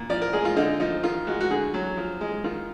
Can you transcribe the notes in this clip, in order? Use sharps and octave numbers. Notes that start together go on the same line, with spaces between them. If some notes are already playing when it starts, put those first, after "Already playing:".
Already playing: A#2
F3 D5
A#4
G#3 G#4
F4
D3 D#4
F3 D#4
D#3 F4
G#3 F#4
F#4
D3 G#4
F#3
F3
G#3
D#3 F4